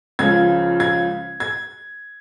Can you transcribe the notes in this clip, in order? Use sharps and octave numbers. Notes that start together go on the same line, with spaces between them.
C#2 C#3 F3 G#6
G#6
G#6